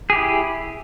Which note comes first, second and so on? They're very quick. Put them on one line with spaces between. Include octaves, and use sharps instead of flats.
G#4 G4 E4